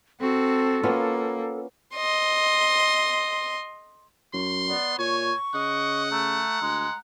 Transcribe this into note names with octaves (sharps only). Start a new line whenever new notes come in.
C4 F#4 A4
A#3 B3 C#4 F4
D#5 C6
F#2 C6
B3 D5
A#2 C#5 G#5 C#6
C#3 D#5 F#5
A3 A#5
D2 G#3